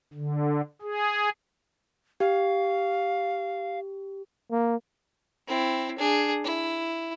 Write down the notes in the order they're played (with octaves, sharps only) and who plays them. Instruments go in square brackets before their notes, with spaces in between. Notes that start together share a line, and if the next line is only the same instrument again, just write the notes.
[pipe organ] D3
G#4
[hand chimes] G4 [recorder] F5
[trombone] A#3
[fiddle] C4 E4
D4 G#4
E4